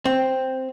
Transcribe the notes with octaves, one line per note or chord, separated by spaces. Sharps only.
C4